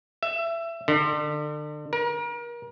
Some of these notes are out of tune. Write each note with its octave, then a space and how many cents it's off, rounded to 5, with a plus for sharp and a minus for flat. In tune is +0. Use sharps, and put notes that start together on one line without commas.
E5 +20
D3 +35
A#4 +35